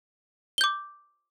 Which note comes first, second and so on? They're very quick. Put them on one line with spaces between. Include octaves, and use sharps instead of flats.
G7 G6 D6